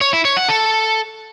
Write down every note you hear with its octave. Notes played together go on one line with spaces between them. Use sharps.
C#5
E4
C#5
F#5
A4